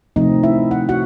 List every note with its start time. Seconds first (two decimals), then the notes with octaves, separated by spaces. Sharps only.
0.16 C3 F3 A3 C4 D#4 D#5
0.43 E4 E5
0.71 F#5
0.89 F#4 F#5